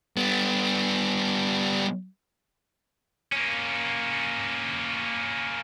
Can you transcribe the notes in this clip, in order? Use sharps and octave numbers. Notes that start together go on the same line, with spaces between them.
G3 B3
A#3 C#4